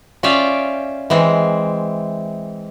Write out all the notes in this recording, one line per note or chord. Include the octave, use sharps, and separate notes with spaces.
C#4 F4 D5 E5 F5 G5
E3 G#3 C4